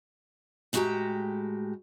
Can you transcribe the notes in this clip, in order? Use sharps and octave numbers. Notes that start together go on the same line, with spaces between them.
A2 G#3 F#4 G4 G5 A#5